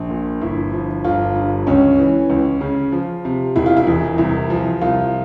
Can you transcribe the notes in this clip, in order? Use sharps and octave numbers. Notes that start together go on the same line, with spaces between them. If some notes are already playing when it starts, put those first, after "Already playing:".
Already playing: A#1
A#2
G1 E4
F3
G1 F4
G2
C#2 C#4
E3
C#2
C#3
F3
C3
E1 E4
F4
E4
E2
C2 E4
F3
C2 F4